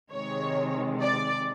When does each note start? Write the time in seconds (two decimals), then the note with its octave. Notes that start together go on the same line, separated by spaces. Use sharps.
0.12 C3 D#3 G#3 C#5
1.01 D5